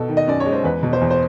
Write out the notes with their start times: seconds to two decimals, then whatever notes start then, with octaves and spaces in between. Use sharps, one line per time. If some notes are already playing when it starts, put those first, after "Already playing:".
Already playing: B2 A4
0.09 D#3
0.17 D#5
0.28 F#2 D5
0.40 C#5
0.46 G#3
0.52 C5
0.64 E2 B4
0.83 B2
0.93 C5
1.01 E2
1.10 C5